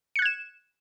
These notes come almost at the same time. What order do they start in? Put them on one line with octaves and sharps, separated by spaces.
C#7 F#6 G#6 E7